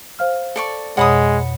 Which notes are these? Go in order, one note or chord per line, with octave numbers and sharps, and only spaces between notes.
C5 F5 F6
A4 D5 C#6
F2 B2 G#3 C#5 F#5 B5 D#6